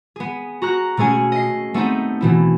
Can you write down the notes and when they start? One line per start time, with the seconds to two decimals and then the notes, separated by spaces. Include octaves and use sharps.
0.16 B3 G#4
0.62 F#4 A#5 F#6
0.97 B2 A3 C#4 G#4 G#5
1.32 D#5 C7
1.74 A3 B3 C4 D#4
2.21 B2 E3 E4